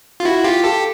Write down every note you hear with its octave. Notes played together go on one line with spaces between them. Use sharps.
F4
E4 F#4
F4 G4
G4 A4